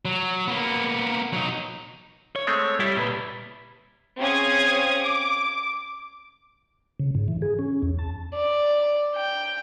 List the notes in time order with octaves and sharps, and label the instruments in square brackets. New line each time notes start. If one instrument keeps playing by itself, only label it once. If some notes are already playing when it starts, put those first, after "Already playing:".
[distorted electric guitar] F#3
A#3 B3
F#3 D#4
[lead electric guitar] C#5
[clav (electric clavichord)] G#3 A3 C4
[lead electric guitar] G3 [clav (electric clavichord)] E4
[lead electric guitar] A#2 B4
[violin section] C4 C#4 G#4 F5 D#6 G#6
D6
[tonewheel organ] C#3
G#2
E3
G#4
C#4
E2
A5
[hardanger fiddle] D5
G5